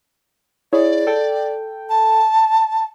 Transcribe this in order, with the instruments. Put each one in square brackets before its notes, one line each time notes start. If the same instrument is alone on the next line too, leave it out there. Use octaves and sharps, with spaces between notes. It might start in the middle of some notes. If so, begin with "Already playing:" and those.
[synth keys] E4 G#4 C#5 [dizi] D5
[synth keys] A4 G5
[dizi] A5